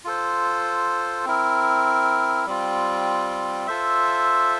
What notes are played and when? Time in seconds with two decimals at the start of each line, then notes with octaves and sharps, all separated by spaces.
0.04 F4 A4 C5
1.25 C4 E4 A#4
2.46 G3 C4 F4
3.67 F4 A4 C5 E5